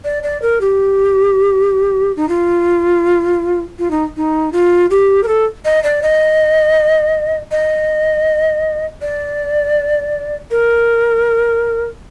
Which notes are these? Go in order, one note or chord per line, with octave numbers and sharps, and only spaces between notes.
D5
D5
A#4
G4
D#4
F4
F4
D#4
D#4
F4
G4
A#4
A4
D#5
D5
D#5
D#5
D5
A#4